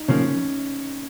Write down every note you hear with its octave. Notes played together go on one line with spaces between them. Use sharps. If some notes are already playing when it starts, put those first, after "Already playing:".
Already playing: D#4
C#3 F3 A#3 C#4